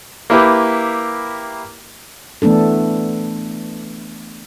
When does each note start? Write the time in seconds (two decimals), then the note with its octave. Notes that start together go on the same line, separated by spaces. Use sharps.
0.30 A#3 E4 G4 B4
2.42 E3 A3 B3 D4 A4